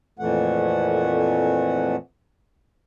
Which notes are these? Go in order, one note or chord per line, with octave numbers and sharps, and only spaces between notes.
F2 A#2 E3 A3 F#5